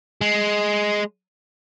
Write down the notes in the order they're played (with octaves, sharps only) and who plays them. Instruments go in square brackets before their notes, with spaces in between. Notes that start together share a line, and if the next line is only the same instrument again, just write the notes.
[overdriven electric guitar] G#3